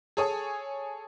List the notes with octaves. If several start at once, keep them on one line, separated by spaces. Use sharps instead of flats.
G#4 A4 C#5 G#5 D#6